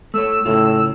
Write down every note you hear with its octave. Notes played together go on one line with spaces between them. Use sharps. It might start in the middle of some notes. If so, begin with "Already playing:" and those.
A3 C#5 E6
A2 C#3 F4